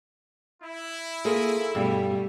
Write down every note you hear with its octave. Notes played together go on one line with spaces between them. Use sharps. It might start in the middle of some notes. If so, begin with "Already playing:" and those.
E4
A#3 F4 G#4 A4
G2 B2 G3 A3